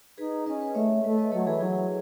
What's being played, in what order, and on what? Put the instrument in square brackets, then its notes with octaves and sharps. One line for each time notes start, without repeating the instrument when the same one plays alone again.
[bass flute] D#4 [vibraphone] G#4 B4
[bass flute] C#4 [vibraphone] B4 D#5
[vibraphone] B4 D#5
[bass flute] A3 [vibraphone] C#5 E5
[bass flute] A3 [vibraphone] B4 D#5
[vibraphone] B4 D#5
[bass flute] F#3 [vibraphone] A4 C#5
[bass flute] E3 [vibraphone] G#4 B4
[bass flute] F#3 [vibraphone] E4 G#4